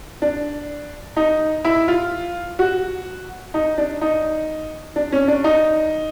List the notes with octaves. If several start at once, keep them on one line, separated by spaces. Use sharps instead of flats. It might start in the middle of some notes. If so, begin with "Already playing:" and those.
D4
D#4
E4
F4
F#4
D#4
D4
D#4
D4
C#4
D4
D#4